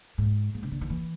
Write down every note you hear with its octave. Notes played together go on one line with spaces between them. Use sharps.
G#2
G#2
C#3
D3
D#3
E3